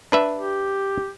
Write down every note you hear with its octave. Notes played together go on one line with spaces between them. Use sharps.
D4 B4 E5
G4